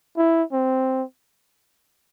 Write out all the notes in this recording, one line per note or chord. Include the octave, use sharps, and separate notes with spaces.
E4
C4